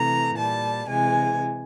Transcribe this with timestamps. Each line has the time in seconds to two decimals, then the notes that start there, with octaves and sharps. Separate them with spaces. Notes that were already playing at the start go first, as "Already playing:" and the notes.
Already playing: C3 E3 A3 A#5
0.36 A#2 G3 A5
0.88 C3 E3 G#3 G#5